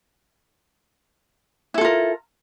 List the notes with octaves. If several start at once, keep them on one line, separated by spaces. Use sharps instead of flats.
E4 F4 A4 A#4